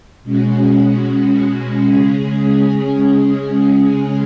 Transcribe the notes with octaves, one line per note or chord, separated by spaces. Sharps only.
B2 G#3 C#4 F#4
C#3 G#3 C#4 G#4